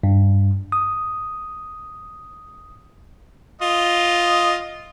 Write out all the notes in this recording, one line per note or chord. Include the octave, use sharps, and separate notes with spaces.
G2
D#6
F4 D#5